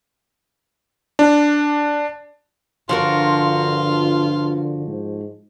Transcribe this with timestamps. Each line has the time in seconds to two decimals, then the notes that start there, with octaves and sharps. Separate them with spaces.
1.19 D4
2.89 G2 D3 F3 F4 F#4 A#4
4.87 G#2